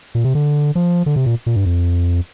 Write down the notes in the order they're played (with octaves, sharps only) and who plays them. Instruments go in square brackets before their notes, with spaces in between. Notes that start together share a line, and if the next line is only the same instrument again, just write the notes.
[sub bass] A#2
C3
D3
F3
D3
C3
A#2
A#2
G2
F2